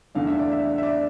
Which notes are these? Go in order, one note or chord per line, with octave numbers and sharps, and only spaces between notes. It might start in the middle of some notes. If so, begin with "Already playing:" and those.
E2 D3 A3 D4 F5
E5
D5
E5
E5
D5